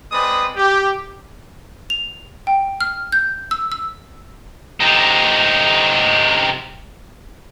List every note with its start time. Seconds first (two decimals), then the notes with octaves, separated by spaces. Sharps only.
0.11 G#3 C4 B4 D5 D#6
0.57 G4
1.90 F7
2.47 G5
2.81 F6
3.12 G6
3.51 E6
3.72 E6
4.80 C3 D#4